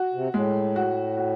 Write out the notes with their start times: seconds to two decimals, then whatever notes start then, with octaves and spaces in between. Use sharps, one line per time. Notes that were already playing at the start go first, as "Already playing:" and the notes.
Already playing: F#4
0.14 C3
0.34 A2 G#3
0.76 F#4
1.17 F#4